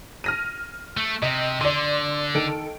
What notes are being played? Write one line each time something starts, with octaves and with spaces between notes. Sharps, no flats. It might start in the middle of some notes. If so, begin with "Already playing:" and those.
F6 A#6 D#7
A3
C3 D#5
D3 D5 C6
D#3 A4 D7